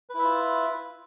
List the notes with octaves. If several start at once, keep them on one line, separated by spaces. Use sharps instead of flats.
E4 F4 B4 E5